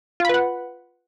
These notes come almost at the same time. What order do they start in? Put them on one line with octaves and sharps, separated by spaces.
F4 B5 B4 F#5